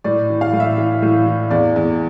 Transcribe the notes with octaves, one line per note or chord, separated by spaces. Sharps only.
A2 D5
E3
F5
A2
E5
E3
A2
E3
E2 D5
E2